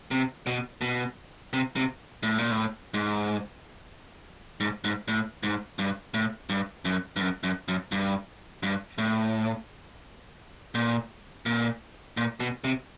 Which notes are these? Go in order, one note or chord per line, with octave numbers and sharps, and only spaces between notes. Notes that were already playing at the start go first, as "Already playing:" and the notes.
C3
B2
B2
C3
C3
A2
A#2
A2
G#2
G#2
G#2
A2
G#2
G2
A2
G2
F#2
G2
F#2
F#2
F#2
G2
G2
A2
A#2
A#2
A#2
B2
C3